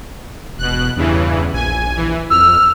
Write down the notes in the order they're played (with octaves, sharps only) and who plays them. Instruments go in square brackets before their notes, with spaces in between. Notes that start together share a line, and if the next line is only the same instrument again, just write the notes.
[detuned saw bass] E1 [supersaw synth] B2 F#6
[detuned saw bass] E2 [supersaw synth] G2 C#3 E3
[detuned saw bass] A#1 [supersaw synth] G#5
[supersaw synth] E3
[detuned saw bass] F2 [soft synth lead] E6 [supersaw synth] F6